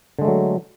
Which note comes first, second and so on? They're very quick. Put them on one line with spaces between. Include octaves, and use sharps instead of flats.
D3 G#3 A3 F#3